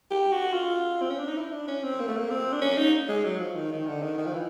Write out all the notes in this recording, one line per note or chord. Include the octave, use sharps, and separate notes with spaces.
G4
F#4
F4
C4
C#4
D4
D#4
E4
D4
C#4
C4
A#3
A3
A#3
C4
D4
C#4
D#4
G#3
F#3
F3
D#3
D#3
D3
D#3
D#3
F3
E3